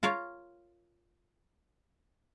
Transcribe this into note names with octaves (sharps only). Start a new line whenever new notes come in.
F4 A#4 C#5 F5